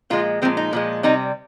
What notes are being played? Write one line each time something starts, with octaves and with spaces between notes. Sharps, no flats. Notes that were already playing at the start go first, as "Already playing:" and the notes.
A#2 F3 G#3 F4
A#2 F3 G#3 C4
D#4
A#2 F3 G#3
C3 G3 D#4